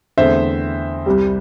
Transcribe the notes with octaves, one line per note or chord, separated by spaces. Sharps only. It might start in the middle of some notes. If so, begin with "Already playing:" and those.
E2 D3 A3 C4 C5 E5
C2 C3 G3